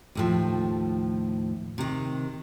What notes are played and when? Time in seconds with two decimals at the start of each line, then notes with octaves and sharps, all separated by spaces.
0.15 D#2 A2 F3
1.78 C3 D#3